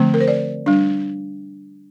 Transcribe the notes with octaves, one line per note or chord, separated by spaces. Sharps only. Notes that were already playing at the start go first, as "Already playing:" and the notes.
Already playing: D3 F3 A3 C4
A#4
C5
D5
G3 D4